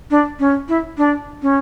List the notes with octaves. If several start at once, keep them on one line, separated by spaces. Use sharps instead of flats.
D4
C#4
E4
D4
C#4